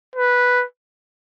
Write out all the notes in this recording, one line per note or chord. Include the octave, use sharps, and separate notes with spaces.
B4